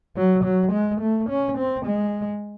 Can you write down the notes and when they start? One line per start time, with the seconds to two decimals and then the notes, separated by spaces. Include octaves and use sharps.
0.16 F#3
0.44 F#3
0.72 G#3
1.01 A3
1.29 C#4
1.57 C4
1.85 G#3